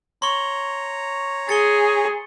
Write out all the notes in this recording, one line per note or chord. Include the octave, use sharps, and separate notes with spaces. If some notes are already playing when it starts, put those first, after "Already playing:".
C#5 A#5 C6 C#6
G#4 A6 C#7 G7